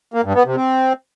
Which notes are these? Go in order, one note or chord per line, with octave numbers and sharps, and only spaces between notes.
A#3
G2
B3
C3
C4